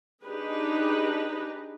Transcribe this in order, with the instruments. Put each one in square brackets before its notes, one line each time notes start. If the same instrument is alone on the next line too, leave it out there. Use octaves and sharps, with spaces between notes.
[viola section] D4 D#4 G4 G#4 B4